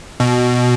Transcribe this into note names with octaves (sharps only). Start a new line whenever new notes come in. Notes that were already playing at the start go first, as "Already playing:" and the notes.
B2